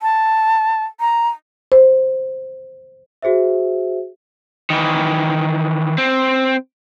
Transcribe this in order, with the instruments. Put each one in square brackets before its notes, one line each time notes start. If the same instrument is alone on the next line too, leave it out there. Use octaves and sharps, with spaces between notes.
[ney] A5
A#5
[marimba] C5
[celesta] F#4 G#4 C5 E5
[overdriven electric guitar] D#3 E3
C4